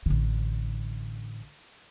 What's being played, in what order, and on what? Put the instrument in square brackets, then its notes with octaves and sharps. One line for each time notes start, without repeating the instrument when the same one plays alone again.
[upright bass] A1 D3